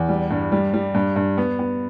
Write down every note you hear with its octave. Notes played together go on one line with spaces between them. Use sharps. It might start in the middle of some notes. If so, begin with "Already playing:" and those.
Already playing: E2
G3
G2
G3
G3
G2
G2
B3
B3